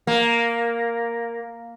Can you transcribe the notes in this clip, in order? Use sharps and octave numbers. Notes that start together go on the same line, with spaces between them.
A#3